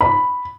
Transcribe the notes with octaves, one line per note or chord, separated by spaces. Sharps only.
B5